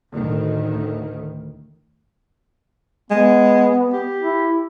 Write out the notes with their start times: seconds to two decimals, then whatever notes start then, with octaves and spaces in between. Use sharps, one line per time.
0.11 D2 A2 D#3
3.11 G#3 B3
3.93 G4
4.21 E4